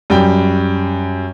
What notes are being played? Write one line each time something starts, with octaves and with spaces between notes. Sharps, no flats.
F#2 G3 G5